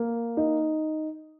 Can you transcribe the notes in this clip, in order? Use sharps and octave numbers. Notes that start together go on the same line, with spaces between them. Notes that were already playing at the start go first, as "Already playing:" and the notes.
Already playing: A#3
D#4